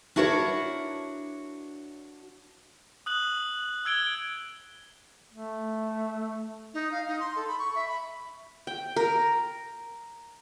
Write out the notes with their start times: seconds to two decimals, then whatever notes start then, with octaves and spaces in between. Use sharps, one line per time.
0.16 D4 E4 F#4 A#4 C5 C#5
3.06 D#6 F#6 F#7
3.85 E6 G#6 D7 G7
5.34 A3
6.74 D#4
6.92 F5
7.08 D#4
7.20 C6
7.36 A4
7.47 B5
7.59 C#6
7.75 E5
7.88 B5
8.67 G5
8.96 A#4